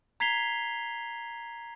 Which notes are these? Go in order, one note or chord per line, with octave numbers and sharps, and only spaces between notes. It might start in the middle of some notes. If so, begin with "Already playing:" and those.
A#5 G#6 B6 C7 F7 G7